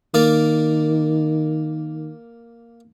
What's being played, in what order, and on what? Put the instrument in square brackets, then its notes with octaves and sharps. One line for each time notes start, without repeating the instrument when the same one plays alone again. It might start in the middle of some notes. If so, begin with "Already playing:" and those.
[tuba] D#3 [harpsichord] A#3 A#4 D5